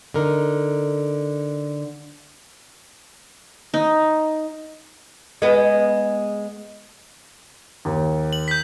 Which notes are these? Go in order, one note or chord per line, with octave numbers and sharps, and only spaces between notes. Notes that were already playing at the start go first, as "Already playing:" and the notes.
D3 D#4 A#4
D#4
G#3 B3
D#2
F#7
G6 B6